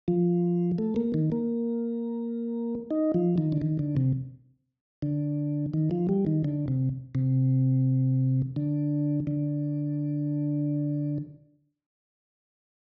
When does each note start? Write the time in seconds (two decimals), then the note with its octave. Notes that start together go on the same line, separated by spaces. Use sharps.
0.08 F3
0.78 A3
0.96 A#3
1.14 D#3
1.32 A#3
2.91 D#4
3.14 F3
3.38 D#3
3.52 D3
3.62 D#3
3.79 D3
3.97 C3
5.02 D3
5.74 D#3
5.91 F3
6.09 G3
6.27 D#3
6.44 D3
6.68 C3
7.15 C3
8.56 D3
9.27 D3